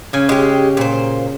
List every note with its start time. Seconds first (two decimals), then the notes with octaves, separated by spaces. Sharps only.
0.13 C#3 G#5
0.29 G#3 G4
0.77 A#2 C5